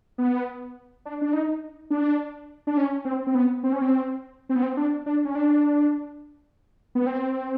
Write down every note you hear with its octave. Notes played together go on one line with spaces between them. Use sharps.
B3
D4
D4
D#4
D4
D4
C#4
C4
C4
B3
C4
C#4
C4
C4
B3
C4
D4
D4
C#4
D4
B3
C4